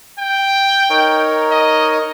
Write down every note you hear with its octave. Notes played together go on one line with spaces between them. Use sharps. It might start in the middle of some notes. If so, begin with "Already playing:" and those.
G5
D#4 A#4 C#5
D#5